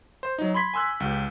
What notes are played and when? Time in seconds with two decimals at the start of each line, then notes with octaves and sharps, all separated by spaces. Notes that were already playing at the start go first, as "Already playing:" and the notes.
0.23 C5
0.38 F#3 D#4
0.54 B5 C6 G#6 B6
0.74 G#5 C6 E6 F#6 G#6
1.00 C#2 G4